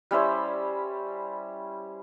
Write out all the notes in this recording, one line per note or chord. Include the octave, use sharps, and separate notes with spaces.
G3 C#4 E4 C5